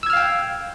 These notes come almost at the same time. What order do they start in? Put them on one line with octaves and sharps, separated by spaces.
E6 G#6 F6 F5 G5